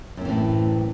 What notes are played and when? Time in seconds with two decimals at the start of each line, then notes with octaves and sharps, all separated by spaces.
0.17 F#2
0.21 C4
0.25 E3
0.29 A2